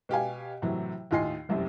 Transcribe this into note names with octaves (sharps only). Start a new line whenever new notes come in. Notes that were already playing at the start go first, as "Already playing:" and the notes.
B2 G4 F5 G#5
A2 C3 E3 F#3
D#2 A2 F4 D#5 G#5 C7
F1 C2 F#2 C3